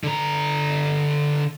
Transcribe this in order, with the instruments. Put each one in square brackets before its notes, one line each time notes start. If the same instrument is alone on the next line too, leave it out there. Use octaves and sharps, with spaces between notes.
[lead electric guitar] D3 A#5